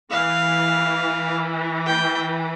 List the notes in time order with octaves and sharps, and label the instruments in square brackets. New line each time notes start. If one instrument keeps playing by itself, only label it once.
[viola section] E3 [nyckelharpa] F5
[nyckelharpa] G5